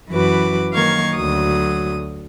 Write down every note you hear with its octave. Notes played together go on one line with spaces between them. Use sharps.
F#2 E3 F#4 B4 D6
D#3 F#3 A#3 F5 C#6 G#6
D2 F#3 D#6